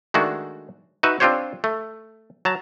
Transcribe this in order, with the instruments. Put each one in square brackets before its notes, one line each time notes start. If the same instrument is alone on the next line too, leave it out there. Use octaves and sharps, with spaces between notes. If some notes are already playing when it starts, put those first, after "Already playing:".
[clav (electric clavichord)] D#3 G#3 A3 D4 F#4
D#4 F#4 B4 E5
C4 D4 F4 G4 C5 C#5
A3
F#3 A5 A#5